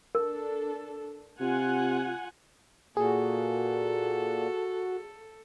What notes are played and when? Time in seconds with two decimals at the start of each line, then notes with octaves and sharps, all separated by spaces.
0.15 D4 A4 A#4
1.41 C3 F4 F#5 G#5
2.97 A#2 A#3 F#4 G#4 A4